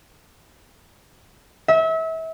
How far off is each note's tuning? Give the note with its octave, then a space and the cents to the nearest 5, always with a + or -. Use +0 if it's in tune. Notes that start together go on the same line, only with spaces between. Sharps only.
E5 -30